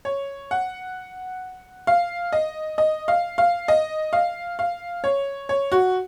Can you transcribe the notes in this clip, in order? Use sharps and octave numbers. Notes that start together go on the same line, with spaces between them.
C#5
F#5
F5
D#5
D#5
F5
F5
D#5
F5
F5
C#5
C#5
F#4